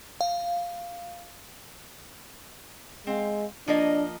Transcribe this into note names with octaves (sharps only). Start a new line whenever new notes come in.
F5
G#3 C4 F5
F3 A#3 D4 D#5